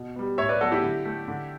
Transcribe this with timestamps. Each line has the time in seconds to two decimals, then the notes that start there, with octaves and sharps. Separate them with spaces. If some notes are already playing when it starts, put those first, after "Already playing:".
Already playing: B2
0.16 G3 B3
0.38 A2 C#5 E5
0.49 B4 D5
0.61 F#3 B3 F#4 A4
0.71 E4 G4
0.83 D3
1.05 A3
1.28 D3